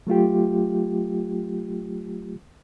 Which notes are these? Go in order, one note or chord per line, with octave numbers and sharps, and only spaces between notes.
F#3 A3 F4 G4